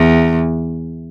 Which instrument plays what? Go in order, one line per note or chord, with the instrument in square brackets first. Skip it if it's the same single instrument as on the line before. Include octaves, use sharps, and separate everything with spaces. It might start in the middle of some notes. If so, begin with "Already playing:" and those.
Already playing: [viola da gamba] E2